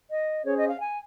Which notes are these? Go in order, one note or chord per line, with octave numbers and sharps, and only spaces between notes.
D#5
C#4 G#4 C5 C#5
D#5
F5
G#5